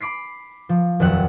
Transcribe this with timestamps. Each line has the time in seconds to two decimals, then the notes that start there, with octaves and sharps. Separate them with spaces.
0.01 B5 D6 B6 C7
0.69 F3
1.00 D#1 F2 F#3 E5 F#5